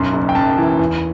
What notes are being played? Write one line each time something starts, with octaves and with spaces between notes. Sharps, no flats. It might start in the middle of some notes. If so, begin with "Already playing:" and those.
Already playing: B1 F#2 C6
F#1
G5
F#2 A5
E3
E2